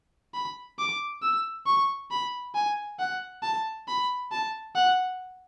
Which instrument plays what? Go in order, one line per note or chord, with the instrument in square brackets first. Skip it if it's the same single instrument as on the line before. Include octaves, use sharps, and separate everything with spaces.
[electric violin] B5
D6
E6
C#6
B5
G#5
F#5
A5
B5
A5
F#5